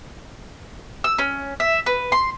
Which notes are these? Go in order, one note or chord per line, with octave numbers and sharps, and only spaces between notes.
E6
C#4
E5
B4
C6